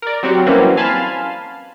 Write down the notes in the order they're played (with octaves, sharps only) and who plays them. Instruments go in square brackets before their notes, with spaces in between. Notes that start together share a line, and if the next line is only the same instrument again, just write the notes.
[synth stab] A#4 D5
F#3 C4 F#4 G4
E3 F#3 G3 A#3 C4 C#4
F5 G#5 A5 B5 C6 F6